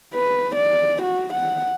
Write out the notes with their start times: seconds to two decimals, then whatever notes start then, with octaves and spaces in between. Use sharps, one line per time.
0.15 B4
0.56 D5
1.03 F#4
1.34 F#5